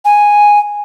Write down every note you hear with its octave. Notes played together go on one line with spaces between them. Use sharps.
G#5